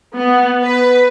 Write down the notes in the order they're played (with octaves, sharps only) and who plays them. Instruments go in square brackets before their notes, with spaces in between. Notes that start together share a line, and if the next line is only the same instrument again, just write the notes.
[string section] B3
B4